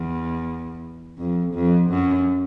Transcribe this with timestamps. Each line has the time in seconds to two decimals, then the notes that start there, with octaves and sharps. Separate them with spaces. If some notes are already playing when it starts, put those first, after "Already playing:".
Already playing: E2
1.18 F2
1.54 F2
1.90 F#2